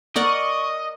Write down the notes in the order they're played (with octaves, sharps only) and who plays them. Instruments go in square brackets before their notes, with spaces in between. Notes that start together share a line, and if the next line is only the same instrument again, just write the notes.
[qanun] A#4 D5 F#5 [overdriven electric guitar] D#5 [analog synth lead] C#6